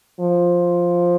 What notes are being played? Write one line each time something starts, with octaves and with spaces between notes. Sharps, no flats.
F3